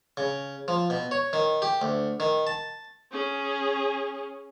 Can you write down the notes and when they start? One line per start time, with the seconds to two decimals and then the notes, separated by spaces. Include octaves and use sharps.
0.17 C#3
0.68 F3
0.90 B2
1.11 C#5
1.33 D#3
1.62 G4
1.82 D2
2.20 D#3
2.47 A5
3.12 C#4 G#4